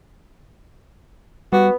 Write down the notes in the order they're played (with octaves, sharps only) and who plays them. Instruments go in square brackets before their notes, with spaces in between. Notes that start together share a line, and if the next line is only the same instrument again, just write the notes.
[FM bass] G3 [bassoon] B3 [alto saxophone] F#4